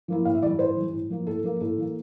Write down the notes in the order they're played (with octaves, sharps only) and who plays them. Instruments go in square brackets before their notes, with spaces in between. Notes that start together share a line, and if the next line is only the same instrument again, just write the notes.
[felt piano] F3 A#3 E4
A2 F5
E5
E3 G3 D5
A2 C5
E3 G3
A2
F3 A#3
A2 A4
F3 A#3 A#4
A2 A4
E3 A#3